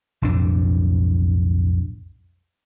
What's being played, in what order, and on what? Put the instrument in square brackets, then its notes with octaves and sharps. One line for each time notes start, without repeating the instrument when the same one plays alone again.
[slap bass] B1 F2 A2 D4